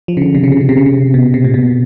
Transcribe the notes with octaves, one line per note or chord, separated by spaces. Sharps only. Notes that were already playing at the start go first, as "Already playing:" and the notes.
F3
C#3
D3
C3
C#3
C3
C#3
C3
C#3
C3
B2
C3
A#2
B2